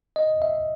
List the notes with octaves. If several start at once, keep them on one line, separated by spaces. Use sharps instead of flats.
D#5
E5